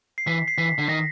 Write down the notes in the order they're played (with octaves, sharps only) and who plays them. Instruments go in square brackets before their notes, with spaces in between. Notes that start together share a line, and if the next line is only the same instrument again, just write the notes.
[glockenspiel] C7
[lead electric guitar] E3 [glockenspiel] B6
[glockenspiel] C7
[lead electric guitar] E3 [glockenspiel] B6
[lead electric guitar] D3
[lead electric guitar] D#3 [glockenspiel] A#6